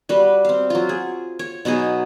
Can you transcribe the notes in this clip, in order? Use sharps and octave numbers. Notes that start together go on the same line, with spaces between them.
G3 F#4 B4
C4 F5
F#3 F4
G#4
C#5
B2 F#3 D#4 G#4